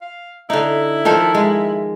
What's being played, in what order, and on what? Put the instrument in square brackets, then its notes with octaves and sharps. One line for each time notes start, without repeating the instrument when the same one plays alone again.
[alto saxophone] F5
[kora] D3 D#4 [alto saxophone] E4
[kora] D#3 F3 A4
G#3